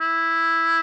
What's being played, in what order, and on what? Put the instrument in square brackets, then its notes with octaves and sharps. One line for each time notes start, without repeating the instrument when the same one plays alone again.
[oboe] E4